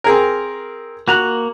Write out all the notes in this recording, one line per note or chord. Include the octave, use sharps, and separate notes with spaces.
C4 G#4 A#4
A#3 F#4 A#5 F#6